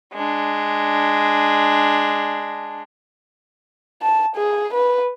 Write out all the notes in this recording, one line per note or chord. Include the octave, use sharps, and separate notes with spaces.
G#3 D4
A5
G#4
B4